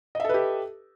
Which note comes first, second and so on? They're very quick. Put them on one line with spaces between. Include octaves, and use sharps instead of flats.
D#5 E5 A4 B4 G4